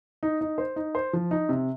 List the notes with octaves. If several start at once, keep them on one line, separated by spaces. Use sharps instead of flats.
D#4
D#4
C5
D#4
C5
F3
D#4
C3